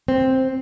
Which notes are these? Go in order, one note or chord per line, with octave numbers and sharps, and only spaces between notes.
C4